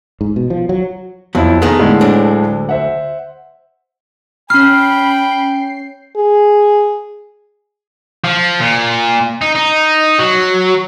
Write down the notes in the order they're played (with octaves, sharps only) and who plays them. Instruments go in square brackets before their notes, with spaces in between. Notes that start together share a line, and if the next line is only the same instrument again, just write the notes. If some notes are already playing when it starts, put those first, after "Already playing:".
[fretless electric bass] G#2
B2
F3
F#3
[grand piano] F2 E4 [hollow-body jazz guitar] F#3 B3
[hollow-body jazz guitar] D#3 A3 B3 [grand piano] G#4 A#4
[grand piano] A2 D3 G#3
[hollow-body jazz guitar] D2 F#3 D4
[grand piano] C5 E5 F#5
[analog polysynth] C#4 C7 [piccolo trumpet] G5 [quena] B5 [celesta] F6
[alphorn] G#4
[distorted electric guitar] F3
A#2
D#4
D#4
F#3